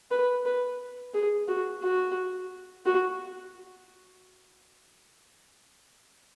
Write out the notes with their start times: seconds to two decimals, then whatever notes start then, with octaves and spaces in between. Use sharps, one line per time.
0.11 B4
0.45 B4
1.14 G#4
1.48 F#4
1.83 F#4
2.86 F#4